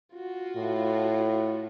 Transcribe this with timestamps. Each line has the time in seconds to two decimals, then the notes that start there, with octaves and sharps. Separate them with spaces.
0.14 F4 F#4
0.56 A2